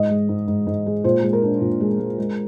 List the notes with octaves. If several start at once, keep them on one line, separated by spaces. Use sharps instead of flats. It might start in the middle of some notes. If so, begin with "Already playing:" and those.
Already playing: G#2 D#5
G#3
G#2
G#2
G#2
G#3
A#2 C5
G#3
A#4
D4
A#2
G#3
G#3
G#3